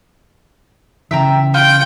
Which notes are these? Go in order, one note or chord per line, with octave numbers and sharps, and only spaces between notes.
C#3 E3 E5 G5 A#5
F4 G5